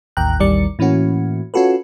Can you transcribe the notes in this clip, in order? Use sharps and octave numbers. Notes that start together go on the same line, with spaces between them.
A1 D#2 G5 A#5 F#6
A1 D#2 D#3 G3 D5 C#7
A2 E3 A#3 C#4 F#4
C#4 F4 F#4 A4 B4